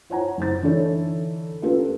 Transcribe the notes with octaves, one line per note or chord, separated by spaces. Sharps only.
F4 C5 C#5 F#5 G#5 A#5
F#1 C5 A6
D3 E3 D4 D#4 A4 C#5
A#3 C#4 F4 G4 A4 B4